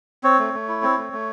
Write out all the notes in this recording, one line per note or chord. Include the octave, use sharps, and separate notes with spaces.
C4 C#5
A3
A3
E4
C4
A3
A3